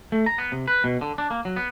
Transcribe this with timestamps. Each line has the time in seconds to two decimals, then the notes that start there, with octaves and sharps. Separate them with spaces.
0.12 A3
0.26 A#5
0.38 B3
0.52 C3
0.68 B4
0.84 B2
1.01 D3
1.18 D4
1.31 A#3
1.45 F#3
1.56 B3